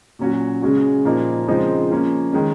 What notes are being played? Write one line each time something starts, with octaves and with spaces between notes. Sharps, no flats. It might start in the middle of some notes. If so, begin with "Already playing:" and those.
A#2 F#3 C#4 F#4
C#3 G#3 C#4 F#4
A#2 F3 A#3 D#4
C#3 F3 G#3 C4 D#4
F3 A#3 C#4
D#3 G#3 C#4